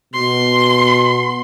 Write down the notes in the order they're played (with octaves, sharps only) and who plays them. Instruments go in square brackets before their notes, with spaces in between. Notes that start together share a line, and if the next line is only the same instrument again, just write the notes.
[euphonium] B2 [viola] C6